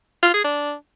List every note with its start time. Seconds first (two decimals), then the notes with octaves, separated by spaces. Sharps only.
0.23 F4
0.34 G#4
0.44 D4